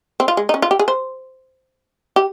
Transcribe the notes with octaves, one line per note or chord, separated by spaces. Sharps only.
C4
F4
G#3
D#4
C#4
F4
G4
G#4
C5
G4